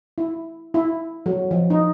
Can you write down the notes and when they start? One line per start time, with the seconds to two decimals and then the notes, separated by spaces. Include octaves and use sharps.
0.18 E4
0.74 E4
1.26 F#3
1.51 F3
1.70 D#4